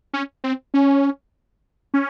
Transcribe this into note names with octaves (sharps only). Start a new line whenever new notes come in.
C#4
C4
C#4
C#4